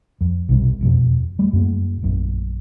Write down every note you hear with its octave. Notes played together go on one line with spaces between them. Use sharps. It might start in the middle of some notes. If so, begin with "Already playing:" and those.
F2
B1 C3 G3
E1 F2 B2
G3 A3
F#2 A#3
A#1 F#2 A#2